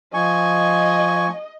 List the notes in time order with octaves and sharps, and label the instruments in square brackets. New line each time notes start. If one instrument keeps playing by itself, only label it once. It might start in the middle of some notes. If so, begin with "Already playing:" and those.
[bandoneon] F3 G#5 C#6 [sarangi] D#5